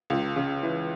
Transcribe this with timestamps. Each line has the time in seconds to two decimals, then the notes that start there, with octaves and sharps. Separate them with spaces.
0.10 C#2
0.36 C#3
0.63 E3